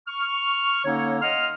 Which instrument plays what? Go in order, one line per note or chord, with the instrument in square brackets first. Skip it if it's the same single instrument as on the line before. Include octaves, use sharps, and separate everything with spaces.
[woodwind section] C#6 F6
D3 A#3 C#4 D#4 C#5
D#5 F#5 C6 F6